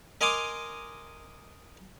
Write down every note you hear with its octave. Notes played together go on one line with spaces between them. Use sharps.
A#4 D#5 G#5 A#5 C6 D6